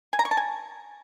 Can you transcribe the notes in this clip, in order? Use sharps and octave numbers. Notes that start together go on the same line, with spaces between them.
G#5
A#5
C#6
A5
G#5